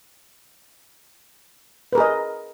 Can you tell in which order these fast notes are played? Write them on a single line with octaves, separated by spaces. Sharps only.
B4 A#4 G#4 D#5